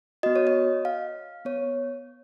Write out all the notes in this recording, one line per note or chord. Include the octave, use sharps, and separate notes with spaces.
B3 F#4 D#5
C#5
D#5
F5
B3 C#5